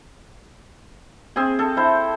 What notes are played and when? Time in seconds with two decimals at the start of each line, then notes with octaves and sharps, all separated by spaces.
1.36 C4 G#4
1.59 A4
1.77 E4 C5